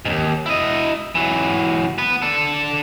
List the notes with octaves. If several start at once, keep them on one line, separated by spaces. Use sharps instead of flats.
D#2 G#2
E4 D#5
E3 F#3
B3 B4
D4 A4